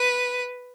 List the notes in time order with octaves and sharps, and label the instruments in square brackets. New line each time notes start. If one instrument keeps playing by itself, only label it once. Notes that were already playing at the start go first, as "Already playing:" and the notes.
Already playing: [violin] B4